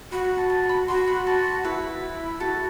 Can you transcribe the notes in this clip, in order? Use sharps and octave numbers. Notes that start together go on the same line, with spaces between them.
F#4 B5
B5
A5
A5
B5
F#4 C6
B5
A5
E4 B4
F#4 A4